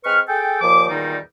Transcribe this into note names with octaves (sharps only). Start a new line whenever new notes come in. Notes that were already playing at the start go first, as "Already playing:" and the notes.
G#3 C4 B4 C#6 F6
G#4 A4 G5
D#2 A#2 F3 D6
E2 A#2 D#3 G3 D#4